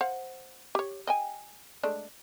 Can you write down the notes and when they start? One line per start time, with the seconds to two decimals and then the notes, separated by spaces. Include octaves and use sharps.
0.01 C5 F5 F#5
0.75 G4 C#5
1.07 D#5 G5 G#5
1.83 G#3 A3 D4